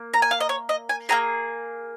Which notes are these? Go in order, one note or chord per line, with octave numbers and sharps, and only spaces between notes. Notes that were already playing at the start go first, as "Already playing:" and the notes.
Already playing: A#3
A#5
G#5
F5
D#5
C#5
D#5
G#5
A#3 F4 G#4 A#5